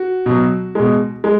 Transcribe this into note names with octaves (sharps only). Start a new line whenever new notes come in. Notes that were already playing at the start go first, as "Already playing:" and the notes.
Already playing: F#4
B2 F#3
B2 G#3
G#3